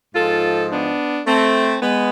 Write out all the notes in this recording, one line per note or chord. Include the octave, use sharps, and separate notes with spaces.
G#2 F3 G#3 F4 A4
B3 D4
A3 C4
G#3 B3